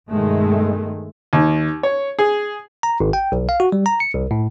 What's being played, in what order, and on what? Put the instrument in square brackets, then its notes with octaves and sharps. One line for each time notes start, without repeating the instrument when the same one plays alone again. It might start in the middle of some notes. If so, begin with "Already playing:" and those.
[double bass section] G2 B2 D#3 G#3 A3
[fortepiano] D#2
C#5
G#4
[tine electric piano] A#5
G#1
G5
B1
F5
F#4
G3
A#5
C#7
C2
A2